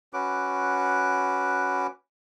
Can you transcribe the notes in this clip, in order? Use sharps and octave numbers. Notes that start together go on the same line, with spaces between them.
C#4 F#4 B4 D6